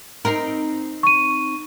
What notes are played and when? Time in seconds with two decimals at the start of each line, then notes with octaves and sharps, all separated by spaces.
0.25 C4 D#4 A#4
1.03 C#6 D#7